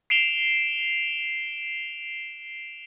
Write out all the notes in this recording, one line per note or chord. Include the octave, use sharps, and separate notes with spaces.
C7 D7 E7 F7 G7